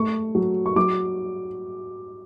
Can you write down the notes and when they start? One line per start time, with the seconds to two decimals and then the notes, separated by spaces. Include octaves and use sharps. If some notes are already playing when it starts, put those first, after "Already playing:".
Already playing: A3 C#6
0.35 F#3
0.66 C#6
0.76 F#3 D6